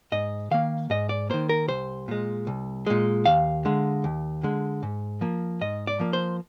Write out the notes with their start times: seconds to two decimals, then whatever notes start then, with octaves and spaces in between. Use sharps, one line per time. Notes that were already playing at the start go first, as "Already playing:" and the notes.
0.12 G#2 D#5
0.51 D#3 A#3 F5
0.90 G#2 D#5
1.09 D5
1.30 D#3 A#3 C5
1.49 A#4
1.68 C2 C5
2.08 A#2 G#3
2.47 C2
2.87 A#2 G#3
3.26 D#2 F5
3.65 D3 G#3
4.04 D#2
4.43 D3 G#3
4.83 G#2
5.21 F3 A#3
5.61 G#2 D#5
5.87 D5
6.00 F3 A#3
6.13 C5